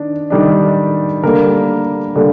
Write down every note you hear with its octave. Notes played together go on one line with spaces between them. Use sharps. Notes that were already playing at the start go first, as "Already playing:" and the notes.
Already playing: D#3 D4
D#3 G3 D4
D3 G3 A#3 D4 A#4
D3 G3 A#3 D4